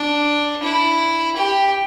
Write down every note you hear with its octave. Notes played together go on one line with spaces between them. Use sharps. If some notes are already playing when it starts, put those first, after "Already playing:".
Already playing: D4
E4
G4